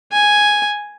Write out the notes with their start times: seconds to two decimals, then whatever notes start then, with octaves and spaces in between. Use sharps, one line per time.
0.12 G#5